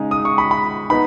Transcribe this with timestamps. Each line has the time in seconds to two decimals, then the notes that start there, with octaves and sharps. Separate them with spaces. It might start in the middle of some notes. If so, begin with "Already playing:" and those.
Already playing: C#3 G#3 D#4 G#5
0.11 D#6
0.25 C#6
0.38 B5
0.51 B5
0.90 B3 D#4 B5